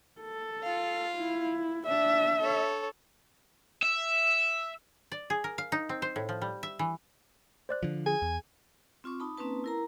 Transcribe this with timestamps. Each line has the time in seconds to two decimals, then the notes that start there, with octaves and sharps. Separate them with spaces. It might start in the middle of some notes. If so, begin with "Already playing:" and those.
0.21 A4
0.63 F4 F5
1.17 E4
1.87 D4 E5
2.40 A4 C#5
3.82 E5
5.12 D5
5.30 G#4
5.44 A#4
5.58 F5
5.72 D#4
5.89 C4
6.02 C5
6.16 A2
6.29 F3
6.42 G3
6.63 E5
6.79 E3
7.69 C5 D5 F#6
7.83 D3 F3
8.06 G#4 G#5
8.22 E2
9.04 C4 F4 C#6 D6
9.20 D#4 A5 B5
9.37 A#3 C4 C#4 D#4 B4 A5
9.64 E4 A#4 A#5